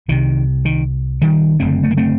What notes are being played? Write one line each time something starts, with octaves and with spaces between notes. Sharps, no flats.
C2 C3 D#3
D#3
D#3 G3
F#1 F#2 D3 A3 C4
A3
A#3
A3 C4